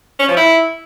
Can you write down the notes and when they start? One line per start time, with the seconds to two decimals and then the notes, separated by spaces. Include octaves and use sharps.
0.20 C#4
0.28 F3
0.37 E4